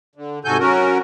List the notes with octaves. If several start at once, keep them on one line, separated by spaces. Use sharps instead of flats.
D3
G#2 C3 F#4 A4 G#5 G6
F#3 C#4 F#4 A#4